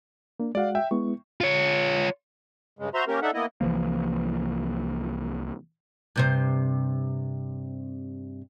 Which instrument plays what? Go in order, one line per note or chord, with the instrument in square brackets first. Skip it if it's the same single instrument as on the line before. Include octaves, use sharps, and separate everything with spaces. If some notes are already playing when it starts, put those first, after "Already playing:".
[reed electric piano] A#3 D4
[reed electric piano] G#3 F#4 F#5 [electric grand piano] D5 F5
[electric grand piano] E5 G5
[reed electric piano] G#3 B3 E4 [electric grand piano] C#6
[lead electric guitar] F4 C#5
[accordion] G2 C#3 G#3
F#4 C5 E5 A#5 C6
A#3 C#4 G4 A#4
D4 D#4 A4 E5 F#5
A#3 B3 E4 D#5
[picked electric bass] C2 E3 F3 A#3
[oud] G2 C3 C5